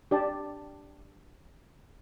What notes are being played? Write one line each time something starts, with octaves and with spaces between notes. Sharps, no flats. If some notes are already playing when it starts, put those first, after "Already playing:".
D4 G4 D5 A5